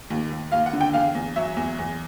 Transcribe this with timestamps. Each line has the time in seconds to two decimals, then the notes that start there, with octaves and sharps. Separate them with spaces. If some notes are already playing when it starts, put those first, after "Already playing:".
0.10 D#2
0.31 D#2
0.52 D#2 F5
0.66 F#5
0.73 D3
0.81 G5
0.94 E2 F5
1.15 E2
1.36 F#3 E5
1.57 E2
1.79 E2